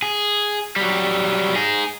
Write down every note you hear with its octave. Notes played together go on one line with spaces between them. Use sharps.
G#4
F#3 G3
D#4 G#4